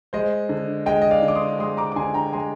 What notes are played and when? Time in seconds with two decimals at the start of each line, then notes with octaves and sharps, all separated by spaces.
0.13 G#3 C5 D#5
0.49 D3
0.86 G#3 D#5 G5
1.02 D#5
1.11 D5 F5
1.22 D3
1.28 D6
1.35 C6 D#6
1.59 G#3 C6 D#6
1.77 A#5 D6
1.92 D6
1.96 D3 G#5 C6
2.14 G5 A#5
2.33 G#3 G#5 C6